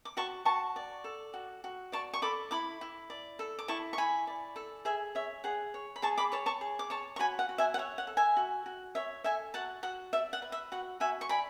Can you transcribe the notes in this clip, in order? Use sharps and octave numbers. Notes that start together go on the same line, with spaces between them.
D6
F#4 A5 C#6
F#4 A5 C#6
D5
A4
F#4
F#4
D5 A5 C#6
C#6
A4 B5 D6
E4 B5 D6
E4
D5
A4
D6
E4 A5 C#6
C#6
E4 G#5 B5
D5
A4
G#4 E5 G#5
C#5 E5
G#4 F#5
C#5
B5
G#4 A5 C#6
B5 D6
C#5 A5 C#6
A5 C#6
G#4
D6
C#5 A5 C#6
C#6
F#4 G#5 B5
F#5
F#4
E5 G#5
F#5
C#5 E5
F#5
A4
E5 G#5
F#4
F#4
C#5 E5
A4 E5 G#5
F#4 F#5 A5
F#4 F#5
D5 E5
F#5
B4
E5
F#4 F#5
F#4 E5 G#5
C#6
D5 G#5 B5